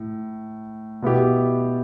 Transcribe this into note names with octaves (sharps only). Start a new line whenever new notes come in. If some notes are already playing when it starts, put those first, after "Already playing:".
Already playing: A2
B2 B3 E4 G4